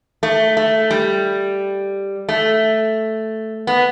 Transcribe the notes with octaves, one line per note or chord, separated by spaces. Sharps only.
A3
A3
G3
A3
B3